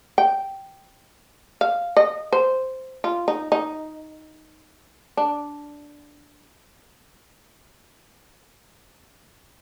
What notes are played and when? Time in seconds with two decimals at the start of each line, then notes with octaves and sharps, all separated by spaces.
0.18 G5
1.61 F5
1.97 D#5
2.32 C5
3.04 F4
3.28 D#4
3.52 D#4
5.17 D4